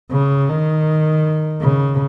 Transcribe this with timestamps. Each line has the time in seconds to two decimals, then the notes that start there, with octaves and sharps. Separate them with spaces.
0.11 C#3
0.49 D#3
1.61 C#3